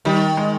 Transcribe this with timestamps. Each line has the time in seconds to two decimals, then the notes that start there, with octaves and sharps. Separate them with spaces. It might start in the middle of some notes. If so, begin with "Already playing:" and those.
0.05 D#3 G3
0.37 G#3